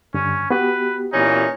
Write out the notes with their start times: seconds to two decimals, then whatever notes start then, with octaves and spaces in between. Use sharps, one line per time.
0.14 G2 D3 C#4
0.51 B3 F#4 G4 B4
1.13 A#2 E3 C#4 D#4